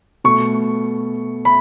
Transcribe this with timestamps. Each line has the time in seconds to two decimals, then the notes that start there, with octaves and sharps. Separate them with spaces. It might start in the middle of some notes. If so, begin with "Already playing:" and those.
0.24 B2 A3 C#6
1.45 B5